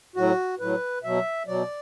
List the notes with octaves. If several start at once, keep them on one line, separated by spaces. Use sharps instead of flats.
A2 F#3 F#4
A2 F#3 B4
B2 F#3 E5
B2 F#3 D5